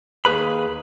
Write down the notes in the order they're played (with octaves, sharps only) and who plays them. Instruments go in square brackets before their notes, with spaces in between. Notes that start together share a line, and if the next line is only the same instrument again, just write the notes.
[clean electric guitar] D#2 A#3 G#4 B4 B5